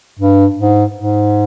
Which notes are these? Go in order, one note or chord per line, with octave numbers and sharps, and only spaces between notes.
G2
G#2
G#2